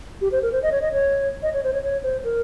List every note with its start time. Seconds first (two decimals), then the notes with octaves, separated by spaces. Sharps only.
0.21 G4
0.32 C5
0.42 A#4
0.52 C5
0.63 D#5
0.72 C#5
0.82 D#5
0.93 C#5
1.43 D#5
1.54 C#5
1.64 C5
1.73 C#5
1.83 C#5
2.03 C5
2.24 A#4